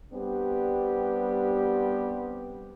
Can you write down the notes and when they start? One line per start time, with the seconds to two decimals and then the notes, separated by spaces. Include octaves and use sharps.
0.13 G3 B3 C4 D4 G4